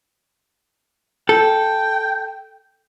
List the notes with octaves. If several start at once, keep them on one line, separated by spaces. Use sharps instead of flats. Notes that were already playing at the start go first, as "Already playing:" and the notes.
A4 G5